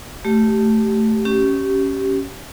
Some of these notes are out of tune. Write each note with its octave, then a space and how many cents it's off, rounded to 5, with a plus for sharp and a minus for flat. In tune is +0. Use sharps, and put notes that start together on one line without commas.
A3 +0 G4 -15
C#4 +0 G4 -20